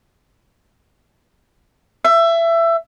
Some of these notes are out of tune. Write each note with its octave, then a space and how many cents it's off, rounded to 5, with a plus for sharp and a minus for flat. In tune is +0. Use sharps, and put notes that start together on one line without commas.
E5 +20